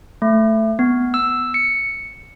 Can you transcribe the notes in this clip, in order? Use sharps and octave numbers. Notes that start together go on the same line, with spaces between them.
A3
B3
E6
C#7